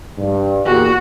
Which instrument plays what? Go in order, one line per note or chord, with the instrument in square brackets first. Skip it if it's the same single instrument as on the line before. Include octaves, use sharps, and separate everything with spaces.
[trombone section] G2
[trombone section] E2 A#2 G4 [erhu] F#4